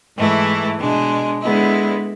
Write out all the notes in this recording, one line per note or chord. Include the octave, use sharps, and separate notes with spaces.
G#2 E3 A3 E4
B2 G#3 D4
D3 G#3 B3 E4